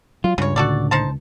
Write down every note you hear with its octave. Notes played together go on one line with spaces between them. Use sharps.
F#3 F4
C#2 G2 C#3 C#5
A2 D3 F#4 A4 D5
D#4 C5 A5